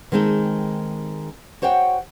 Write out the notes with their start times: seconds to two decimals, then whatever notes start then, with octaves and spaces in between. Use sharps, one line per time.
0.12 D#3 G#3 C4 D#4 A4
1.62 F#4 C5 C#5 F#5 G5